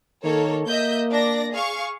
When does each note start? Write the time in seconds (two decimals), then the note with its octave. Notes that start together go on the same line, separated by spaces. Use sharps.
0.24 D#3 A#3 A4 C#5
0.66 A#3 D#5 E5 G6
1.10 D4 D5 A#6
1.53 G#4 F5 C#6